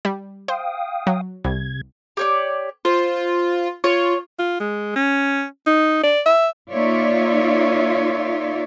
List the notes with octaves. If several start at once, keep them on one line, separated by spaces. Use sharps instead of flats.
G3
C5 F5 G5 D#6
F#3
C2 C3 G#6
G4 C#5 D5
F4 C5
F4 C#5
F4
G#3
C#4
D#4
D5
E5
A#3 D#4 F4 C#5 D5 E5